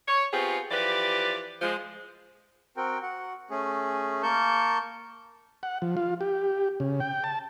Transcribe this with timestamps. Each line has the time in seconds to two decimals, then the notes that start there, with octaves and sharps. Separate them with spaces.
0.08 C#5
0.32 B3 C4 F4 G4 G#4
0.71 E3 F3 G4 B4 D5
1.62 F3 G#3
2.77 C4 F#4 A#4 G5
3.02 F#4 F#5
3.50 A3 C#4 G#4
4.23 A#3 A#4 A5 C#6 G6
5.63 F#5
5.82 F3
5.97 F4
6.21 G4
6.80 C#3
7.00 G5
7.24 A5